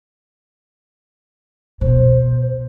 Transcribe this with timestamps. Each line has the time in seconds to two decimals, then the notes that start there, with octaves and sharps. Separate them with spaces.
1.81 B2 C5